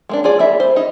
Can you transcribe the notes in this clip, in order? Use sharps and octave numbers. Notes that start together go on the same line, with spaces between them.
G#3 A#3 D4
F4 G#4 D5
A#3 E4 E5
C5
D#4